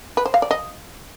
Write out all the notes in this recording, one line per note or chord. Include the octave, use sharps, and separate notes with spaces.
B4
C5
F5
D5
D#5